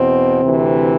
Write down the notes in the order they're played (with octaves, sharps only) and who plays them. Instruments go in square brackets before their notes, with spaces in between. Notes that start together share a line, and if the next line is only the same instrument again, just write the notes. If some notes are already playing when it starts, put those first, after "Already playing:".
Already playing: [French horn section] E2 B2 C4
D2 C3 E3